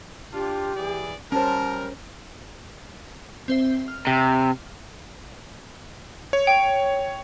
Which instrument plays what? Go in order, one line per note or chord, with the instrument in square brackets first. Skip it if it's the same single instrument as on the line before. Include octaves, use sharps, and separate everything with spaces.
[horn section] D4 F4 [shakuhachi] G4
[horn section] E3 G#4 D5
[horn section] G3 A#4 [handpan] C#4 C5 [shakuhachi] A5
[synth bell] C4 C5 E5
F6
[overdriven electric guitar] C3
[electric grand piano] C#5
[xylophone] G5